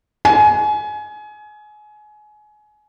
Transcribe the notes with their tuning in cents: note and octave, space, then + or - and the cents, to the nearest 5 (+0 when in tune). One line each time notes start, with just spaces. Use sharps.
G#5 +25